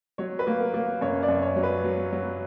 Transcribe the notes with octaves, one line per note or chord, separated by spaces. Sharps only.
F#3 C#5
B4
A#3
A#4
A#3
F#2 C#5
D5
F#2
C#5
F#3
B4
F#3
F#3